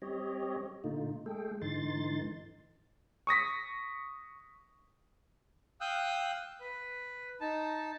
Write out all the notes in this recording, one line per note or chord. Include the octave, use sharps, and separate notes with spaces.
G3 C4 G4 C#5 D#5
A#2 D3 A3 D#4 F4
G#3 A3 G#4 A4 G5
G#2 D3 E3 D#4 C6 A6
C#6 D#6 A#6 B6
F5 G5 D#6 E6 F#6 G6
B4
D#4 A5